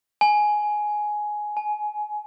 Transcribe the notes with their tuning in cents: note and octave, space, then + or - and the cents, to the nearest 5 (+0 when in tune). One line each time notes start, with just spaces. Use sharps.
G#5 +10
G#5 +25